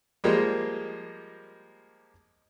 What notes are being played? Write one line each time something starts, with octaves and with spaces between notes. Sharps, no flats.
F3 G3 G#3 A#3